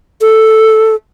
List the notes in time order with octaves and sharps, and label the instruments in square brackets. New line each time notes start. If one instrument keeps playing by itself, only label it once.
[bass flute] A4